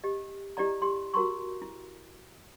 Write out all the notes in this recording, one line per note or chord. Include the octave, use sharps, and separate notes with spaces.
G4 D#5
E4 G4 D5 D#5 A#5
G4 C6
F#4 A#4 A#5 C6 C#6
E4